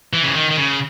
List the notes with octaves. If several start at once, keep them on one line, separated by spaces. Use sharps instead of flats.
E3
C#3
D#3
D#3
C#3